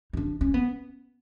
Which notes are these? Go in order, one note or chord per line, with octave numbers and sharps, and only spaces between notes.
D#4
D4
C#4
B3